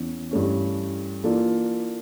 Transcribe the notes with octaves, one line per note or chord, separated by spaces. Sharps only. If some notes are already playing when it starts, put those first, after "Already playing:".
Already playing: E2 E3 C#4
G2 E3 A3 C#4
E3 A#3 D4 F4 A4